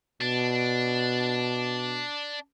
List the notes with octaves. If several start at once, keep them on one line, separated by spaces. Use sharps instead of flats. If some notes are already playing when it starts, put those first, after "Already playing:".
B2 D4